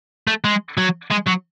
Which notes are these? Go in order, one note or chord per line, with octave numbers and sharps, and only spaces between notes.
A3
G#3
F#3
G#3
F#3